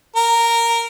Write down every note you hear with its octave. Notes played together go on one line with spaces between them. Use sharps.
A#4